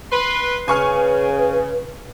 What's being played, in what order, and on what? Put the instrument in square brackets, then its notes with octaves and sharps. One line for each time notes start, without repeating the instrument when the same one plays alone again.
[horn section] B4 C6
[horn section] C#3 [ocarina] B4 [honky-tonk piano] G#5 C#6 F6